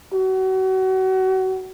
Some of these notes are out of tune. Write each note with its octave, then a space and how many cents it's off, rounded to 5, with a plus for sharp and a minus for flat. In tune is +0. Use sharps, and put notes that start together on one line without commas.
F#4 +30